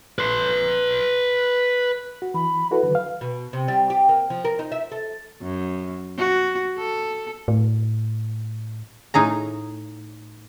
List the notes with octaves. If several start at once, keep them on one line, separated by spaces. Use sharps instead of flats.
B4 C6
F#4
E3 B5
E4 F#4 A4 B4
D3 D#3 F#3
F5
B2
C3
G3
G4
A#3
F3
A#4
D#4
E5
A4
F#2
F#4
A4
A2
A2 D#4 G#4 A#5